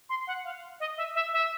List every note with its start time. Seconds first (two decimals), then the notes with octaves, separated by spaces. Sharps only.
0.09 C6
0.27 F#5
0.45 F5
0.80 D#5
0.97 E5
1.15 E5
1.33 E5